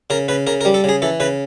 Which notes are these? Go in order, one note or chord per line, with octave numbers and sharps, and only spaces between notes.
C#3 A#4
C#3 B4
C#3 A#4
A#4
G3
A4
C#3 G#4
E3 A4
C#3 B4